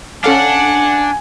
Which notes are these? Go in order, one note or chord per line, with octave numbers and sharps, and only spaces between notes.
C#4 D4 A4 F5 F#5 G#5